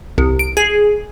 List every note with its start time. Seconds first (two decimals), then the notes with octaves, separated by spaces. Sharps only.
0.18 C2
0.39 D7
0.57 G#4